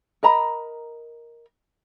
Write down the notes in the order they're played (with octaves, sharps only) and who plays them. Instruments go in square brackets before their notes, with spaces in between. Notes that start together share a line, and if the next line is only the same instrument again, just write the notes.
[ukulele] A#4 D#5 A#5 B5